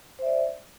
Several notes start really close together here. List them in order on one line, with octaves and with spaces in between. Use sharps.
C5 E5 D5